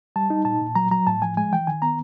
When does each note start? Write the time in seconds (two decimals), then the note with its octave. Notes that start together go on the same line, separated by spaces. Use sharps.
0.16 G3 A5
0.30 D#4
0.45 A#2 A5
0.61 A#2
0.75 F#3 A#5
0.91 F#3 A#5
1.07 A2 A5
1.22 F3 G#5
1.37 G#3 G#5
1.53 E3 G5
1.67 D#3 G#5
1.82 B3 A#5